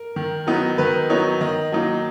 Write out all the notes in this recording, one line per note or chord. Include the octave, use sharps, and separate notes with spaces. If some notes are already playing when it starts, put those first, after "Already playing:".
Already playing: A#4
D#3
F#3 B3 D#4
D#3 B4
F#3 B3 D#4 C#5
D#3 D#5
F#3 A#3 D#4